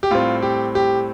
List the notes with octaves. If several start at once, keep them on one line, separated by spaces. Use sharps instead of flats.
G4
A2 G3 C4 F4
G4
G4